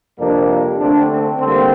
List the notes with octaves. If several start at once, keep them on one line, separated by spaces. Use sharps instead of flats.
F2 C3 G3 A#3 D4
D3 A3 C4 D4
C4
D3 G3 A#3 C4